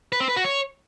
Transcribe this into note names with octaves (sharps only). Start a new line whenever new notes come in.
B4
C4
B4
F#4
C#5